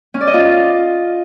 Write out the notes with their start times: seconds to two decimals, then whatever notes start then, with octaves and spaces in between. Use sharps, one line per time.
0.14 C#4
0.21 D5
0.27 D#5
0.34 F4